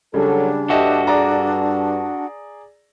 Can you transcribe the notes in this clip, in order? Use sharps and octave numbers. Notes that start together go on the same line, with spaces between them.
C#3 F#3 G3 D4 A4
G2 F#4 G4 A4 D#5 E5
G#4 D5 A#5